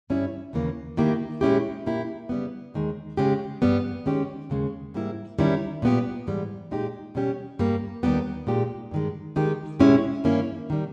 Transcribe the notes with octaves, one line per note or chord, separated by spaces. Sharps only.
G2 G3 C#4 E4
D#2 C#3 E3 A#3
D#3 A#3 E4 G4
A#2 G#3 C#4 E4 G4
A#2 A#3 E4 G4
C#3 G3 B3
D#2 D#3 G#3
C#3 G#3 C#4 G4
G2 G3 B3
D#3 G#3 C#4 G4
D#2 C#3 G#3
G#2 G3 A#3 E4
D#3 G3 C#4 E4
A#2 G3 B3 G4
G#2 E3 G3
A#2 G#3 D#4 G4
B2 G3 C#4 G4
G2 G3 A#3
D#2 D#3 G3 B3 G4
A#2 G#3 D#4 G4
G2 D#3 G#3
D#3 G#3 D#4 G4
B2 G#3 C#4 E4 G4
G2 D#3 A#3 C#4 E4
D#3 G3